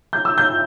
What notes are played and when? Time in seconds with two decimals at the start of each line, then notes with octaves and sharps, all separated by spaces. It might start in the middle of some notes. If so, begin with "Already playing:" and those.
0.13 G6
0.25 E6
0.38 G6